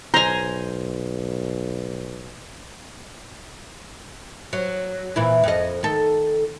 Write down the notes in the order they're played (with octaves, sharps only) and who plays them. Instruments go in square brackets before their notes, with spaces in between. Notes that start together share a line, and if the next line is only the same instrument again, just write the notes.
[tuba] B1 [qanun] C5 G#5 [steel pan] A#5
[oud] F#3
A#2 E3 E4
F2 D#5
D#3 A4